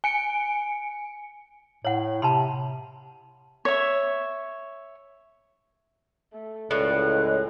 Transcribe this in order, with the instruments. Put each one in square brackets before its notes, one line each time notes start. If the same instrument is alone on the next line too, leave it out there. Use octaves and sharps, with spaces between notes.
[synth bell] G#5 C#7 D7
[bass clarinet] A2 [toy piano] C#5 F#5
[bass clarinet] C3 [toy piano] A5 B5 C6
[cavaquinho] C#5 E5
[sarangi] A3
[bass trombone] C#2 [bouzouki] A2 [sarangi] D5 [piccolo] F#6
[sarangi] G#3